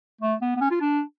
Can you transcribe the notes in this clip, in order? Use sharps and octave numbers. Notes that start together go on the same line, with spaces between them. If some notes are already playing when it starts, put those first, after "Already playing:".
A3
B3
B3
C#4
F4
D4